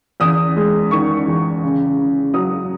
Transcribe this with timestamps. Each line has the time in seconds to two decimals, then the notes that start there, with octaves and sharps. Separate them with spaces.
0.20 E2 D#6
0.57 G#3
0.91 D#3 C#6
1.27 E2
1.63 C#3
1.98 C#3
2.34 F#3 D#6